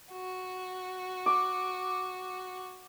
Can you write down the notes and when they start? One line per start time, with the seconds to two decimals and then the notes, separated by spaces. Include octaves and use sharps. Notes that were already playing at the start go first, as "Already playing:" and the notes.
0.12 F#4
1.26 D6